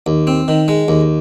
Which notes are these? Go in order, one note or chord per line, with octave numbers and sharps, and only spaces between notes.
D#2
C4
D#3
G#3
D#2